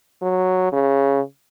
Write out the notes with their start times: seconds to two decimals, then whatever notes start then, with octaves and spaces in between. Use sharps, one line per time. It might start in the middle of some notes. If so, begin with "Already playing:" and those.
0.22 F#3
0.73 C#3